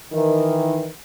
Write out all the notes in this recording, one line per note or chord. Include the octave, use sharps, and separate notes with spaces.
D#3 E3